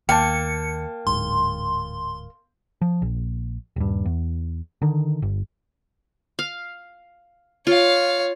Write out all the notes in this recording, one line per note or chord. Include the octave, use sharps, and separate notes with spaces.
D#2 A#3 G5 A5 C#7
D1 G#2 C6
F3
A#1
D#1 G2
E2
D3 D#3
G1
F5
F4 C#5 F5